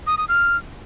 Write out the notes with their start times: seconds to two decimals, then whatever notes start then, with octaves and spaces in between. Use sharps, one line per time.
0.07 D#6
0.18 D#6
0.29 F6